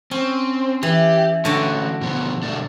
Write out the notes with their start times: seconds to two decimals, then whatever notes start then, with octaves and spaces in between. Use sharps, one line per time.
0.11 C4 C#4
0.83 E3 G4
1.45 D3 A3 C#4 F#4
2.01 B2 F3 B3
2.43 B2 A3 D4